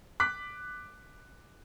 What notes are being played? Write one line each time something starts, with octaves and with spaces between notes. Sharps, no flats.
D6 F#6 B6